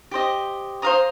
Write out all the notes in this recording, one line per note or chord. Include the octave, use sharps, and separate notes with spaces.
G4 C5 D#5
C5 F5 A#5 D#6